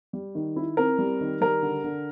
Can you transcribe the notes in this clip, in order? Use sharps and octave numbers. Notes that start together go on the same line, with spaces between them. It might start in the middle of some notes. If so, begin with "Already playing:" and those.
G3
D#3
E4
C4 A#4
G3
D#3
G3 A#4
D3
D3